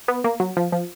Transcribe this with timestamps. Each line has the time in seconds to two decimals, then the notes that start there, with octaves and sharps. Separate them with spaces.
0.08 B3
0.24 A#3
0.40 F#3
0.57 F3
0.72 F3